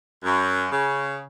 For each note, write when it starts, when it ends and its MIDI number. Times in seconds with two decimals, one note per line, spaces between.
0.24 0.67 42
0.70 1.24 49